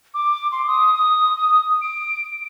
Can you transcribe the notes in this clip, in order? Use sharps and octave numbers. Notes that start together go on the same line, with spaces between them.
D6
C6
D#6
D#6
D7